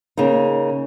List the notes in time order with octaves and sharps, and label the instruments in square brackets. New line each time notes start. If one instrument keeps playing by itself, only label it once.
[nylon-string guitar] C#3 A#3 D#4